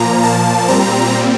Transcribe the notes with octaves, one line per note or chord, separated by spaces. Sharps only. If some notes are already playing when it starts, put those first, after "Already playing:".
Already playing: A#2 F3 A#3 A#5
A5
A#2 G3 C4 A#5